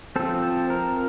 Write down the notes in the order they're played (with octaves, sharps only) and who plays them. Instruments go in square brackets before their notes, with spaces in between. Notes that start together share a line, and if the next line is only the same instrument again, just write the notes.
[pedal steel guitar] F3 C4 A4
A#4